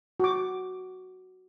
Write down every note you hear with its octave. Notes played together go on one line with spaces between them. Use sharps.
F#4 D6